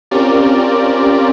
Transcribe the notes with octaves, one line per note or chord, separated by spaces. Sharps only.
C4 C#4 F4 G4 A#4 D5